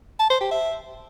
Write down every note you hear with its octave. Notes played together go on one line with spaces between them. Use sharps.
A5
C5
G4
E5